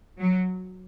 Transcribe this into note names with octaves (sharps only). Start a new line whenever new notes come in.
F#3